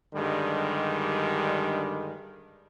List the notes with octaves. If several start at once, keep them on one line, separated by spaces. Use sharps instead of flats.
G2 D3 D#3 G3 G#3